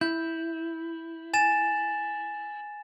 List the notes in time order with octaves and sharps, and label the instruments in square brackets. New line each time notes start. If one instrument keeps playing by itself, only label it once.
[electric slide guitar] E4 [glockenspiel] G6
[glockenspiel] G#5 A6 E7